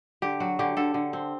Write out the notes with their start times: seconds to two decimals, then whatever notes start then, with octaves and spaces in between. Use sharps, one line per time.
0.22 D3 G4
0.40 F#3 F#4
0.59 D3 G4
0.77 D3 A4
0.94 D3
1.13 C4